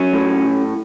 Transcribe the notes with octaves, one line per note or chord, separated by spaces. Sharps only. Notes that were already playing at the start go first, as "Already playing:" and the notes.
Already playing: F#3 C#4
A2